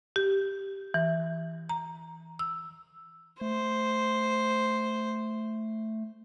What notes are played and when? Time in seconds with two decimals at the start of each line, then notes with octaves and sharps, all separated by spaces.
0.16 G4
0.94 E3
1.69 A#5
2.39 E6
3.41 A3 C5